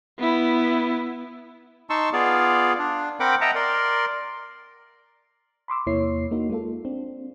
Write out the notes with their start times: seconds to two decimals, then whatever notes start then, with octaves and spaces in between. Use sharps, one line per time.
0.19 B3 E4
1.90 D#4 A5 C6 C#6 E6
2.13 B3 F4 G#4 D5 F5
2.79 D4
3.20 C4 A#4 F#5 G5 B5 D6
3.41 D#5 E5 F#5 G5 A5 A#5
3.55 A#4 D5 C6
5.68 B5 C6 D6 E6
5.86 E2 C3 A#3 E4 C#5 C7
6.31 A#3 D#4 F#4
6.50 G#3 A#3 F4 A4
6.85 C4 D4